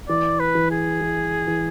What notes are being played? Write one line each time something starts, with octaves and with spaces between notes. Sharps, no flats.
E3 D5
B4
E3
G#4
E3
E3